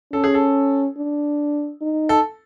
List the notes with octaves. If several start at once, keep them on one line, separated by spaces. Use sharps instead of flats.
C#4 A4
G#4
A4
D4
D#4
A4